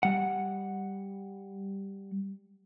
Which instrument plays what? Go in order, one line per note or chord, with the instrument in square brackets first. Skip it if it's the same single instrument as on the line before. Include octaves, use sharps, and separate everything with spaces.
[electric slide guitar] G3 F#5